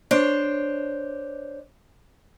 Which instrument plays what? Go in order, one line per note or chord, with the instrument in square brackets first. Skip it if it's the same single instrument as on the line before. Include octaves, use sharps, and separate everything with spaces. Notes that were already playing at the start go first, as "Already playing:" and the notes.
[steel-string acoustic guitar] D4 C5 C#5